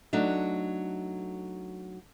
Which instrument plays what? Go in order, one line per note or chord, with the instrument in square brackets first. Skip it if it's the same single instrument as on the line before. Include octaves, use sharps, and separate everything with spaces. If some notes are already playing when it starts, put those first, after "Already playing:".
[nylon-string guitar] F#3 A3 D4 D#4